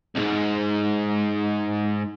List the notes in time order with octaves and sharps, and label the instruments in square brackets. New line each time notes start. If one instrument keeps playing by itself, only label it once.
[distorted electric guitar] C2 G#2